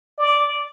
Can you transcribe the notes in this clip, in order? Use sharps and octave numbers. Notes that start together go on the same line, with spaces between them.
D5